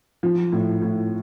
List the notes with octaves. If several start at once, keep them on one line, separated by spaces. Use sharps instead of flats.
F3
A2
A2